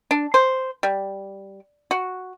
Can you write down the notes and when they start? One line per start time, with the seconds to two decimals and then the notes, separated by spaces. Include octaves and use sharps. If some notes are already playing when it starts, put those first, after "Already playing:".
0.11 D4
0.34 C5
0.83 G3
1.91 F#4